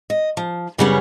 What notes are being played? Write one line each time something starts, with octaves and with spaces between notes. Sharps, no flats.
D#5
F3
F#2 C#3 E3 G3 B3 C#4